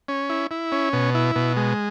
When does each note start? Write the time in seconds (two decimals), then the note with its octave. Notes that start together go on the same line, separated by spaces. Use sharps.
0.08 C#4
0.30 E4
0.51 E4
0.72 C#4
0.93 B2
1.15 E4
1.36 B2
1.57 G#3